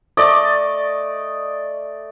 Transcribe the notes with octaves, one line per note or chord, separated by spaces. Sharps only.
A3 D5 D#5